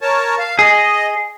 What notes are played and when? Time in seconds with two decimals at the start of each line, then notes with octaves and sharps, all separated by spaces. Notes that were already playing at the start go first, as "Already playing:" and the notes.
0.01 A#4 C#5 A5
0.38 F5
0.59 G#4 D#5